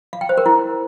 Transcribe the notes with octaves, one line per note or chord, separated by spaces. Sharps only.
F5
G5
C5
A#4
E4